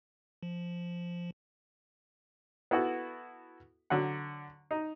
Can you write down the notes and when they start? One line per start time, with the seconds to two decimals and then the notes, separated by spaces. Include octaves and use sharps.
0.43 F3
2.71 B3 E4 F#4 A4
3.90 D3 F#3 F#4 F#5
4.71 D#4